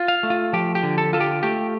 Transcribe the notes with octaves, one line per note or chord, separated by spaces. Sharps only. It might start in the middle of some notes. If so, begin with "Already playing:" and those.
Already playing: F4
F5
A3
F4
F3 G4
G4
D3
A4
F4 A4
G4
A3 G4